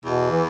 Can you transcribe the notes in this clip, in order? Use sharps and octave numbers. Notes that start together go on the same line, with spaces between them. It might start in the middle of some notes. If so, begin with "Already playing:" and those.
E2 B2
E3